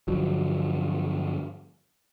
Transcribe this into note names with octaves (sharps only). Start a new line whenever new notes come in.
G2 D3 F3 F#3